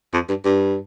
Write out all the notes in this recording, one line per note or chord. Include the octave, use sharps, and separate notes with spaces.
F2
G2
G2